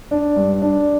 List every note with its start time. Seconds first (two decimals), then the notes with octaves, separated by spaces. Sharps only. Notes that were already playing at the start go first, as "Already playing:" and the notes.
0.11 D4
0.36 G2
0.62 D4